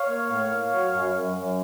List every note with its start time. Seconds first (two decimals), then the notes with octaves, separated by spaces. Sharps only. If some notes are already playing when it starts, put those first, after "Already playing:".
Already playing: C#5 F5
0.09 A#3
0.29 A2
0.51 A#3
0.73 F#3
0.93 F#2
1.15 F#2
1.36 F#2